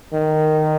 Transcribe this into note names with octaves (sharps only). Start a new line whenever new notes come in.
D#3